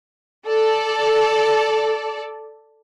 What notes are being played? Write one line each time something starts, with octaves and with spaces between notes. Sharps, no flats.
A4 D5